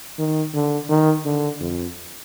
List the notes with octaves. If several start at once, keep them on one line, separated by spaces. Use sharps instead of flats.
D#3
D3
D#3
D3
F2